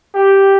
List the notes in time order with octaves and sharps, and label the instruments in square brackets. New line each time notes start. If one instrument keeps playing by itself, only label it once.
[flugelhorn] G4